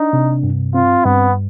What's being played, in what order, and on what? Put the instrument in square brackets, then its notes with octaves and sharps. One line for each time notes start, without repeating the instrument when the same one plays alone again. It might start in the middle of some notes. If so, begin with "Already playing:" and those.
Already playing: [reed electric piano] D4 [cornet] D#4
[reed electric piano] C3
G2
[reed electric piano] C4 [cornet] F4
[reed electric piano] G2 [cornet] B3